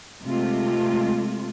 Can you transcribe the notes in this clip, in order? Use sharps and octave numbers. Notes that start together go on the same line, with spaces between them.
C3 G#3 A3 F4